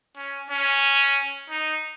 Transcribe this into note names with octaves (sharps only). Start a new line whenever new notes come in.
C#4
C#4
D#4